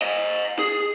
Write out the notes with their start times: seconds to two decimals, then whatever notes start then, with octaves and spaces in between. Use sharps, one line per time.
0.02 C5 D#5
0.59 G#4